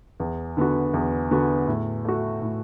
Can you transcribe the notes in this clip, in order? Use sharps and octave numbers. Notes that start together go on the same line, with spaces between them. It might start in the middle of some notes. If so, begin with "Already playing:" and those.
E2
D3 B3 F#4
E2
D3 B3 F#4
A2
A3 F#4
A2